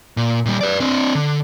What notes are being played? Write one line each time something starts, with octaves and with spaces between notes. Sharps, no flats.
A#2
A#2 G3
B4 D5
C4 D4
D3